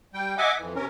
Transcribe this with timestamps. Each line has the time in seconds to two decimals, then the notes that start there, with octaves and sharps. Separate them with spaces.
0.14 G3 G5
0.38 D#5 E5 F#5 G#5 D6
0.58 F2 E3
0.75 C3 C#4 A#4